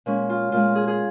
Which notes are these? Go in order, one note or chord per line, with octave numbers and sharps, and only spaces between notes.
A#2 G#3 C#4
F4
A#2 G#3 F4
G#4
G#4